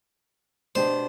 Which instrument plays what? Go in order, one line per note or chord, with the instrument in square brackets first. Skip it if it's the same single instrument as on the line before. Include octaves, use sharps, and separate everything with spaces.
[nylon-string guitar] B2 B3 D4 G4 [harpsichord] C5